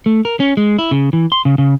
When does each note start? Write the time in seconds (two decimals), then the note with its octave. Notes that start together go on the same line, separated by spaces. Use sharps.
0.06 A3
0.25 A#4
0.40 C#4
0.57 G#3
0.79 E4
0.91 C#3
1.13 E3
1.32 C6
1.45 C#3
1.58 C#3